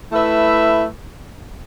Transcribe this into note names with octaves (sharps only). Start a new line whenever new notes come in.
A3 E4 B4 E5